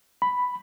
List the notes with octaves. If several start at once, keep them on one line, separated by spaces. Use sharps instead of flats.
B5